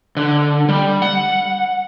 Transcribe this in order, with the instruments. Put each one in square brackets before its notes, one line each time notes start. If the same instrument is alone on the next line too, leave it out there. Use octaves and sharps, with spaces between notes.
[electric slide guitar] D3
G3
F#5